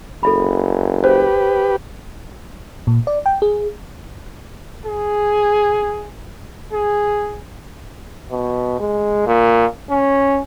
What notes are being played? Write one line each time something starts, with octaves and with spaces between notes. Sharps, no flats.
F#1 A4 E5 B5
G4 B4 C5
A#2
D5
G5
G#4
G#4
G#4
B2
G#3
A#2
C#4